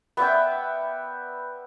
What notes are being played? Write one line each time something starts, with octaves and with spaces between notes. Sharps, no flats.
B3 D5 E5 G5